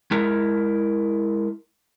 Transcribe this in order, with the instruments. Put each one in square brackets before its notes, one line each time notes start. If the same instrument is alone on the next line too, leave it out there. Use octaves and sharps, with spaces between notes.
[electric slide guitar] G#3 E4 A#4